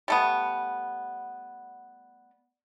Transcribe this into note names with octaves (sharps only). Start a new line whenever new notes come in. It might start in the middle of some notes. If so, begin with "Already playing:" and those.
G3 A3 B3